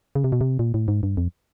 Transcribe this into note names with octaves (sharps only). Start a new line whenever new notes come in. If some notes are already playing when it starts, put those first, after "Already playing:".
C#3
C3
B2
C3
A#2
A2
G#2
G2
F2